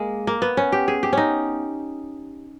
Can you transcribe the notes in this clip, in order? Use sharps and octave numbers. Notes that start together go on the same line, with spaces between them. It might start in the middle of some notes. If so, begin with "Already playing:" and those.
Already playing: G#3 A#3
A#3
B3
C#4
G4
G#4
G4
C#4 D#4